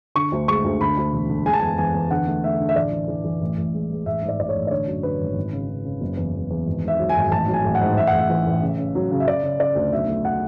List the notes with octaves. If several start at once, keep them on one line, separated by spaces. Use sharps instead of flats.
D3 C#6
D2
G#3 C#6
D2
D3 B5
D2
E1
D3
G#3 G#5
A5
E2 G#5
E2 G#5
E2
D3 F#5
A3
A3 E5
D3
E5
A1 D5
E3
E3
E3
A1
A1
G#3
G#3
A1 E5
G#2
D5
A1 D5
C#5
A1
D5
D3 C#5
F#2
D3 B4
G#1
G#1
C#3
C#3
C#3
F#1
E2
E2
E2
G#1
G#2 E5
F#3
G#5
G#1
A1 A5
F#3
G#5
A1
F#5
G#2
A1 E5
F#5
A1
E5
E3
A1
C#3
C#3
F#3
C#3
E5
C#3 D5
C#3
C#3 D5
D2
B1 E5
A3
F#5